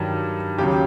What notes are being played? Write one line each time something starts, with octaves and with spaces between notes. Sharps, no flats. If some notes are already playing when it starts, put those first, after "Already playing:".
Already playing: G2 D#3 F#3
D#2 C#3 F#3 G4